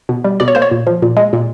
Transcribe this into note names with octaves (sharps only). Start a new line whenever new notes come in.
B2
G3
B2 D5
C#5
A#3 C5
C#5
A#2
F3
A#2
G#3
A#2